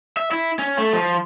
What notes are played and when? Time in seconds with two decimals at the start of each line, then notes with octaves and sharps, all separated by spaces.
0.17 E5
0.31 E4
0.59 C#4
0.78 A3
0.93 F3